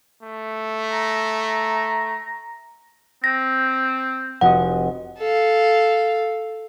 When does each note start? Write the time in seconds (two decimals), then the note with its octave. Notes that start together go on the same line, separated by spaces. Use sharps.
0.23 A3
0.92 A#5
3.24 C4 A#6
4.41 F1 F#4 D#5 F#5
5.18 A4 F5